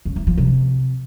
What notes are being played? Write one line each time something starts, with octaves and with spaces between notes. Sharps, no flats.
C#3
E3
F3
C3